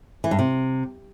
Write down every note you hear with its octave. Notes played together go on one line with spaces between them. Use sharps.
E3
G2
C3